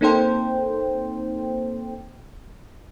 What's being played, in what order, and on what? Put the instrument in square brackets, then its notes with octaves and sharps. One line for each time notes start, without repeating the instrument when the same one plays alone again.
[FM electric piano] A#3 C4 D#4 A4 C5 G5